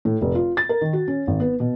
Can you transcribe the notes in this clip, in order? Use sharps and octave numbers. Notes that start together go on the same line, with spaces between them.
A2
F1
F4
A6
A#4
D#3
F#4
C#4
G#1
B3
B2